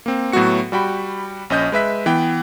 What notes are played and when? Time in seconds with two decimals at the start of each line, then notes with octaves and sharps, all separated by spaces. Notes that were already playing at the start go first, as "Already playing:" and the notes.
0.06 A#3 C4
0.32 A2 F#3 A3 B3 F#4 C#7
0.72 G3 F#4 G5 B5
1.50 A#1 C#4 D#5 G6
1.72 G#3 B4 E5 B6
2.06 E3 B3 G5